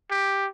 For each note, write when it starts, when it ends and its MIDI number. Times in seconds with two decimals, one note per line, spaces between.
0.11 0.47 67